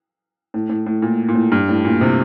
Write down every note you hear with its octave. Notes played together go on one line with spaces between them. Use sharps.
A2
A2
A2
A#2
A#2
A2
G2
A2
A#2
C3